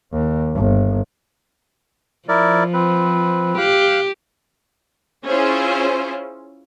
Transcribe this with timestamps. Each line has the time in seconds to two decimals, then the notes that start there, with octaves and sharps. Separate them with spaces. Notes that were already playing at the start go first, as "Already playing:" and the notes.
0.12 D#2
0.55 G1
2.29 F3 E4 A#4 D5
2.73 C4 B4
3.58 G4 F5 F#6
5.26 C#4 E4 F4 G#4 C5 C#5